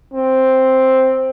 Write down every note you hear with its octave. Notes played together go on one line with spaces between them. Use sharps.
C4